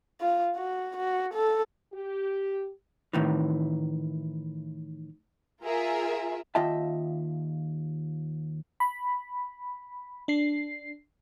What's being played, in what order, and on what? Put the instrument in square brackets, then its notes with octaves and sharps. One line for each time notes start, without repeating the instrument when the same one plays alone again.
[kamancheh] F4
F#4
F#4
A4
[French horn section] G4
[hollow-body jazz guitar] A2 D#3 E3
[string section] F4 G#4 A#4 E5
[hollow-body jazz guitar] D#2 F4 D#5 E5 G5 A5
[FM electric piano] B5
D4 C7